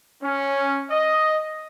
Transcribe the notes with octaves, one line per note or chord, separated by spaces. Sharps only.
C#4
D#5